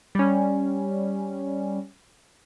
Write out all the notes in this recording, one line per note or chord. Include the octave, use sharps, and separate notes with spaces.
G3 C#4